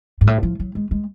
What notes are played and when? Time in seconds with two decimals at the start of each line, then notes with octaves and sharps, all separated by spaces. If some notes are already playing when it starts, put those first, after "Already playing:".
0.21 G#2
0.27 A2
0.43 F3
0.60 F#3
0.75 G#3
0.91 G#3